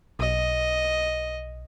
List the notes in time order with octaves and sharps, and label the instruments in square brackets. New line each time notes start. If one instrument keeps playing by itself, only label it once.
[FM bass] B1 [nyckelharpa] D#5